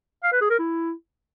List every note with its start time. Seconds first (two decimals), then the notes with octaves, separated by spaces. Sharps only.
0.24 F5
0.32 B4
0.41 G#4
0.50 A#4
0.59 E4